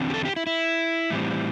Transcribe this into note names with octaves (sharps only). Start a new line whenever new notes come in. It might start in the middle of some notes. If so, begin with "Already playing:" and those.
Already playing: E2 D3 C4
G4
A4
G4
E4
E4
A2 E3 G3 C4